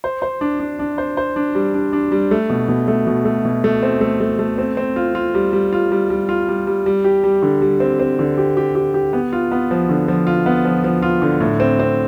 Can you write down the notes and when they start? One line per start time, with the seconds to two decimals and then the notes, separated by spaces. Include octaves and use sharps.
0.04 C5
0.22 C5
0.41 D4
0.60 D4
0.79 D4
0.98 C5
1.17 C5
1.36 D4
1.55 G3
1.74 D4
1.93 D4
2.12 G3
2.31 A3
2.50 B2
2.68 B2
2.88 A3
3.07 B2
3.25 A3
3.45 B2
3.64 A3
3.83 C4
4.01 A3
4.20 A3
4.39 A3
4.58 C4
4.77 C4
4.96 F4
5.15 F4
5.35 G3
5.53 G3
5.73 F4
5.92 G3
6.10 G3
6.29 F4
6.49 G3
6.67 G3
6.86 G3
7.04 G4
7.24 G3
7.42 D3
7.62 G3
7.80 C4
7.99 C4
8.19 D3
8.38 G4
8.57 G4
8.75 G4
8.94 G4
9.13 B3
9.33 F4
9.52 B3
9.71 F3
9.89 D3
10.08 F3
10.27 F4
10.46 B3
10.65 F3
10.84 F3
11.02 F4
11.22 D3
11.40 A2
11.60 C4
11.79 C4